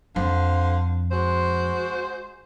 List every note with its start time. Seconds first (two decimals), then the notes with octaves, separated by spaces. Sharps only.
0.16 F2 D3 C5 F5
1.11 G#3 F#4 C5